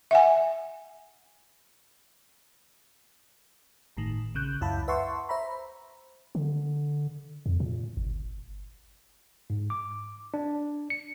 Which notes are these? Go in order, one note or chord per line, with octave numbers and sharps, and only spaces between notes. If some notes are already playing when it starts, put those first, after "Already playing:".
E5 F#5 G#5
G1 A2 D#3
A#1 C#3 F#6 G6
C#2 F#2 E4 F5 A5 B5
B4 E5 F#5 A5 C6 C#6
C5 E5 A#5 B5
D3
F2
A#2
G1
G#2
D6
D4
C#7